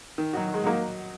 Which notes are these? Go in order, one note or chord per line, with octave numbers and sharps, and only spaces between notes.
D#3
F#3 D#4 F#4
D#3
G#3
F#3 A#3 D#4 F#4